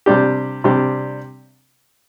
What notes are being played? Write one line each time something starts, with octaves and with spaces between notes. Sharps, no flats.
C3 G3 D4 G4
C3 G3 D4 G4